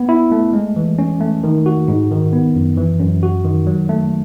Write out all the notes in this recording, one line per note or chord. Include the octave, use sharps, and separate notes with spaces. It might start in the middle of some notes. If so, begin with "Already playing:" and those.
Already playing: B3
E4
A3
G#3
E3
C#4
A3
D#3
F#4
G#2
D#3
B3
F#2
E3
F#2
F#4
D#3
F#3
A3